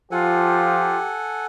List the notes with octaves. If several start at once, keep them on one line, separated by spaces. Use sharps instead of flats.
F3 F4 G4 A4 F#5 G#5